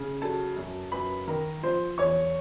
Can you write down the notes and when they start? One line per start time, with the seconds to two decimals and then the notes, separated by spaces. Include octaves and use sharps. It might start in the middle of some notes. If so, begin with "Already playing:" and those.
Already playing: C#3
0.22 F#3 A4 A5
0.57 F#2
0.92 F#2 B4 B5
1.27 D#3 A#4 A#5
1.63 F3 C5 C6
1.98 E2 C#5 C#6